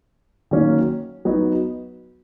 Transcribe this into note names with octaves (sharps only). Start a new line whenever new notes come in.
D#3 F#3 A#3 C#4
F#3 B3 D#4